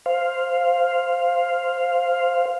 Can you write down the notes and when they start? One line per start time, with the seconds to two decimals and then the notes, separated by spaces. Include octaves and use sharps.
0.06 C5 F5